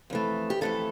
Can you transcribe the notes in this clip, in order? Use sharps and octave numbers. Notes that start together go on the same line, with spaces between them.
F2 E3 A3
G4
F2 E3 A3 A4